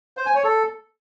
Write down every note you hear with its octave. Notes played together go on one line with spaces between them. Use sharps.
C5
G#5
C#5
A4